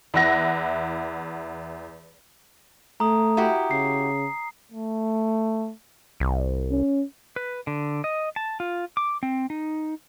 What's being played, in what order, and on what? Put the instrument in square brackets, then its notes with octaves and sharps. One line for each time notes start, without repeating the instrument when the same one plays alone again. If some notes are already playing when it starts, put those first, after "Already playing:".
[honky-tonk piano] E2 E4 E5 F#5 A#6
[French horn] A3 [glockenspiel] A#5 D#6
[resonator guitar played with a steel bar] E4 F#4 G4
[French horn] C#3 [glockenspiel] C7
[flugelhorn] A3
[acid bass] C2
[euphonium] C#4
[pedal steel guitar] B4
D3
D#5
A5
F4
D6
C4
D#4